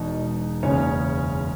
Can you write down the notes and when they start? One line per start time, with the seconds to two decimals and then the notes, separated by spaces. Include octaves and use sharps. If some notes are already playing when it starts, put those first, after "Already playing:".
Already playing: E1 E2 B2 D#4
0.63 F#1 E2 C#3 C#4 C#5